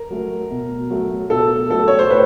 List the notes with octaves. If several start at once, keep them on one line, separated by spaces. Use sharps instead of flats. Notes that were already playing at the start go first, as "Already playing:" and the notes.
Already playing: A#4
F#3 A3
B2
F#3 A3
B2 A4
F#3 A3 A4
C#5
C5
A2 B4